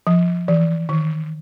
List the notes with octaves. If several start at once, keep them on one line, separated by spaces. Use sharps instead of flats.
F3
E3
D#3